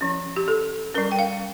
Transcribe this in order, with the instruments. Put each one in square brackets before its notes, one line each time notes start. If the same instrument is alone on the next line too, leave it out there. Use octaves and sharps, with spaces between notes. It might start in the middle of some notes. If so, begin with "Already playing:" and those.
[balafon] F3 C#4
G4
A4
C#4 A#4
G3
G5
F5